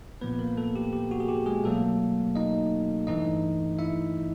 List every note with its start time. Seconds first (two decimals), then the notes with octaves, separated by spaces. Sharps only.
0.21 A#2 F3 A#3 B3 B4
0.39 A#3 A#4
0.57 A3 A4
0.76 G4
0.93 G4
1.11 F#4
1.20 G#4
1.28 G4
1.46 G#3 G#4
1.64 B2 F#3 A3 A#3 A4
2.36 D#4 D#5
3.07 G2 E3 A3 D#4 D#5
3.79 E4 E5